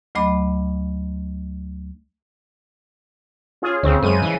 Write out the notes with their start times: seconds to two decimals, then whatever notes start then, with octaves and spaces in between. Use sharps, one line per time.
0.15 D2 F#3 A3 D#5 B5 D6
3.62 C#4 F4 G#4
3.83 D2 C#3 C4
4.03 F#2 C#3 G#3 D#7
4.22 E3